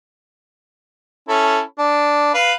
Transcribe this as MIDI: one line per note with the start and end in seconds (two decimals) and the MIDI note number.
1.29 1.60 61
1.29 1.60 64
1.29 1.60 69
1.78 2.33 62
2.34 2.53 71
2.34 2.53 77